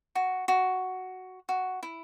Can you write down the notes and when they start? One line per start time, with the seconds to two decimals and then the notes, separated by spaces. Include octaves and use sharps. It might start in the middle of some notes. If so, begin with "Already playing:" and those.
0.15 F#4
0.48 F#4
1.49 F#4
1.83 E4